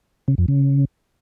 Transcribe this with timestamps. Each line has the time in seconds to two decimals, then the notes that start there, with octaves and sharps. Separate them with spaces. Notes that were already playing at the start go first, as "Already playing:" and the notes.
0.28 C#3
0.38 F2
0.48 C#3